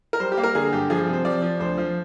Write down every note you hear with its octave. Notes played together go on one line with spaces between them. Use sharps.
A#4
G3 C5
G4
A#3
A#4
D3 G#4
G2 G4
F3 G#4
C3
C5
F3 D5
F3
D2 C5
F3